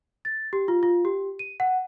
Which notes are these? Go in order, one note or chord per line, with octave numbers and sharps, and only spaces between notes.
A6
G4
F4
F4
G4
D#7
F#5